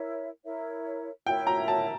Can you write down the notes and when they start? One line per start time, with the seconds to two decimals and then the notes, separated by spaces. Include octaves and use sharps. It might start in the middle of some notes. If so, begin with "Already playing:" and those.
Already playing: E4 A#4 C#5 E5
0.45 E4 A#4 C#5 E5
1.26 E4 A#4 C#5 E5 G5
1.47 A#5
1.68 A5